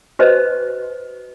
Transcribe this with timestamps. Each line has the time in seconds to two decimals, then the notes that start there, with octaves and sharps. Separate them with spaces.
0.19 F#4 B4 C5 D#5